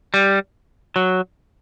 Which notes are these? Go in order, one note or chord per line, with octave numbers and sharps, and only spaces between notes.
G3
F#3